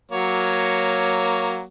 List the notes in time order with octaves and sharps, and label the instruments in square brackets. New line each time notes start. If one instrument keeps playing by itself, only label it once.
[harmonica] F#3 A#3 C#5